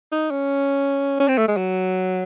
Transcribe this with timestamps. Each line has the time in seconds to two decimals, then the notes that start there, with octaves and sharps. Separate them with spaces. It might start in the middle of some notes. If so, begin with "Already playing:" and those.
0.12 D#4
0.31 C#4
1.20 C#4
1.28 C4
1.38 A3
1.48 G#3
1.57 F#3